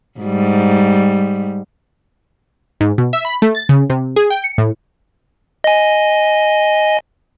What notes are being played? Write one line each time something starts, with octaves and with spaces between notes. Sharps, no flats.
G#2 G3
G#2
B2
E5
B5
A3
A6
C#3
C3
G#4
G5
C#7
A2
D#5 G#5